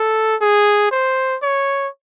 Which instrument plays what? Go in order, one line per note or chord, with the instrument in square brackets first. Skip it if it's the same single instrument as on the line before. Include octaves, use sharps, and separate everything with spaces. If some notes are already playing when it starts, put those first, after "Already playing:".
Already playing: [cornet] A4
G#4
C5
C#5